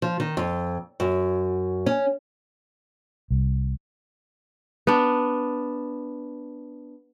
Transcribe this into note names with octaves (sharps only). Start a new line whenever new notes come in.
F3
D#3
F2
F#2
C#4
C2
B3 D4